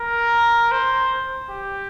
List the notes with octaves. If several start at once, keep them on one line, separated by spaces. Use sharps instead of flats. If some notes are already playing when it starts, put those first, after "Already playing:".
Already playing: A#4
C5
G4